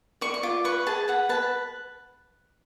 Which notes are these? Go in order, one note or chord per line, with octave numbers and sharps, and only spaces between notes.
D5 C#6
C#6
F4 D6
B4 C#6
G#4 A5
B4 F#5
B4 A5